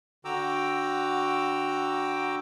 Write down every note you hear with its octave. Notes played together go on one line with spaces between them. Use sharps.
D3 F#4 G5 A#5 D6 E6